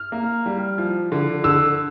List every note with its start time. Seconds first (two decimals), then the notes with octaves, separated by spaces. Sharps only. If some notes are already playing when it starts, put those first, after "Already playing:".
Already playing: F6
0.12 A#3
0.46 G3
0.78 F3
1.12 D3
1.44 D3 E6